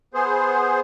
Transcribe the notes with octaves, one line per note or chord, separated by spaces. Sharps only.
B3 G#4 C5